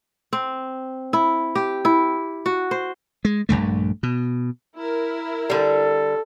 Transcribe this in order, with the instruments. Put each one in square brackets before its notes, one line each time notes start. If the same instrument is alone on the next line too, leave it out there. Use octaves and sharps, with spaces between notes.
[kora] C4
E4
G4
E4
F#4
C5
[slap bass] G#3
A#1 E2 G2 A3
B2
[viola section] E4 A#4
[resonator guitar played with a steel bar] D3 G3 [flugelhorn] A4